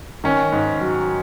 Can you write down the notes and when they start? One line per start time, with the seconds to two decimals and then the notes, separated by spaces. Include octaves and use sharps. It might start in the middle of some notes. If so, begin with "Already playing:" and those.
0.24 D#3 C#4
0.52 G#2
0.81 F#3